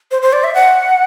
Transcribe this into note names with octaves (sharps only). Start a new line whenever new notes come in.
C5
C5
D5
E5
F#5